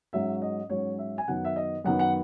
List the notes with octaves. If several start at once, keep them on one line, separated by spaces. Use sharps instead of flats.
G#2 F#3 C#4 E5
D#5
G#2 F#3 C#4 C#5
E5
G#5
F#2 D#3 F#3 B3 F#5
E5
D#5
F#2 D#3 F#3 B3 F#5
F#5